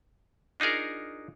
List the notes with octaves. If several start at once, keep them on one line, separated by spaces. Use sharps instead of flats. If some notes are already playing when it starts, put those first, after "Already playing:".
D4 D#4 F4 G#4 A#4